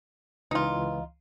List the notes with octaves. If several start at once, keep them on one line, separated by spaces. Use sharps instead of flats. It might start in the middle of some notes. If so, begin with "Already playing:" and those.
C#2 E3 D#4 F4